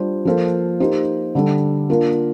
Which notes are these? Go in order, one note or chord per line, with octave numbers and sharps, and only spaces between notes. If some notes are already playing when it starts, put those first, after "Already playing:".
Already playing: G3 D4 F4 C5
F3 A#3 F4 A4 C5
A#3 D#4 G4 C5
D3 G3 D4 A4
A#3 D4 F4 A#4